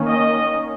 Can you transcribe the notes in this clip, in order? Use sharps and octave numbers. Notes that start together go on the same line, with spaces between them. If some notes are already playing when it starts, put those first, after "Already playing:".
Already playing: D#3 A#3 C#4
D#5